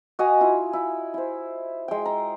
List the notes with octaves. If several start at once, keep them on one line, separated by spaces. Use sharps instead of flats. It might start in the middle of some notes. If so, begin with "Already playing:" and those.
F#4 D#5 F5 G#5
E4 F4
E4
E4 C5
G#3 G5
A#5